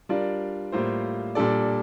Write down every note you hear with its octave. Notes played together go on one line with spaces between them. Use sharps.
G3 D4 F4 A#4 D5
A2 G3 A#3 F4 C5
A#2 G3 D4 A4 D5